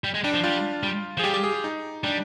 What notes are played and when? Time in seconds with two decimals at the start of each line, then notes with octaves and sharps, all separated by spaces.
0.04 G3
0.14 G#3
0.24 G3 D4
0.34 F3
0.44 G3 F4
0.83 G3
1.18 F3 G#4
1.24 G3 G4
1.34 G4
1.44 G#4
1.54 G4
1.64 D#4
2.03 G3 D4